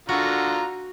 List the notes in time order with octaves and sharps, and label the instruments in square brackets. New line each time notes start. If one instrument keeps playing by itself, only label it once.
[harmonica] D3 F4 A#5 [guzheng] F#4